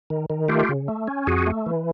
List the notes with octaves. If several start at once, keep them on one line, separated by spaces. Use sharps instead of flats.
D#3
D#3
A3 F4 G4
C#3
A3
C#4
F2 F#4 G#4
A3
E3